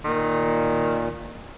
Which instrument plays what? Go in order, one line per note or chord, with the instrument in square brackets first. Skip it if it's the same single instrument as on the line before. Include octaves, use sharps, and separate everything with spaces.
[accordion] A#2 [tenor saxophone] D#3